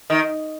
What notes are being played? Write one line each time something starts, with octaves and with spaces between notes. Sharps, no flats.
D#3